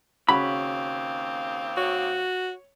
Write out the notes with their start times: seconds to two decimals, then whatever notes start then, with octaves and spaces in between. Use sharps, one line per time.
0.29 D#2 C#3 C4 C#4 F#4 F5 B5
1.77 F#4 C#5